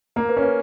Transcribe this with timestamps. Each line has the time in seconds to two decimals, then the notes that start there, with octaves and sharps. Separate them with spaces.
0.16 A#3 A#4
0.29 B4
0.37 C#4
0.43 B4